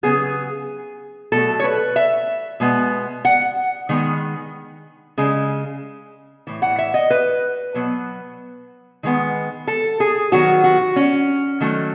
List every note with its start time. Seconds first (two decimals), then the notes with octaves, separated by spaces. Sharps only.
0.03 C#3 F#3 B3 G#4
1.32 B2 F#3 A3 A4
1.59 C#5
1.64 B4
1.96 E5
2.60 B2 G#3 B3
3.25 F#5
3.89 D#3 G#3 B3
5.18 C#3 G#3
6.47 A2 E3
6.62 F#5
6.79 E5
6.94 D#5
7.10 B4
7.74 B2 F#3 B3
9.03 D#3 G#3 B3
9.67 A4
10.00 G#4
10.32 D#3 F#3 B3 F#4
10.64 F#4
10.96 C#4
11.60 D#3 F#3 A3